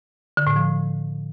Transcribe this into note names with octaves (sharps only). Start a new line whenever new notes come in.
D3
A2
F3